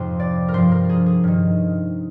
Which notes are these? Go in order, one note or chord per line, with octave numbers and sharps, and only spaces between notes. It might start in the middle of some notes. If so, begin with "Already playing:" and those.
Already playing: F2 G#2 C3 F3 G#4 C5
D5
A#4
G2 F3 C5
A#4
G#4
G#4
G2 D#3